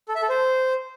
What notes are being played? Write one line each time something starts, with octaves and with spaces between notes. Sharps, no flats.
A4
E5
A4
C5